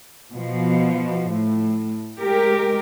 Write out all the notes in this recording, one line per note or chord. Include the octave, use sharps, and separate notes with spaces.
B2 F3
A2
G#3 G4 A#4